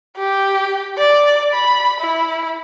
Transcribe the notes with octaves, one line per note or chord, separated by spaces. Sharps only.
G4
D5
B5
E4